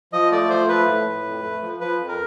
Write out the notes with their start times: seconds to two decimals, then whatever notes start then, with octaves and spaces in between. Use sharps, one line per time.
0.13 F3 D#5
0.32 A3 D5
0.50 F3 C5
0.68 A3 B4
0.87 A2
1.06 A2
1.25 F2
1.43 A3
1.62 F3
1.80 F3 B4
1.99 F2
2.08 A#4